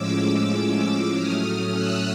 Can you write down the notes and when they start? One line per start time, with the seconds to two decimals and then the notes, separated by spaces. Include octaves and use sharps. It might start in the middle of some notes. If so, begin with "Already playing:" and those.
Already playing: A2 F3 G#3 C#4 D6 E6
0.50 D6 E6
0.81 D6 E6
1.12 A2 F#3 A3 C#4 D#6 F6
1.73 E6 F#6